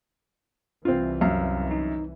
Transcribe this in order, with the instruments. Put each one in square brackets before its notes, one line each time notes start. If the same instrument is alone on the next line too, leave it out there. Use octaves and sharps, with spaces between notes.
[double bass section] C2 E3 [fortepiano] C4 F4
[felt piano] F#2 [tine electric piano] F5
[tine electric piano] D#4